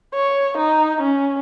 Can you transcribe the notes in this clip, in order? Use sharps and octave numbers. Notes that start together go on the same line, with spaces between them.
C#5
D#4
C#4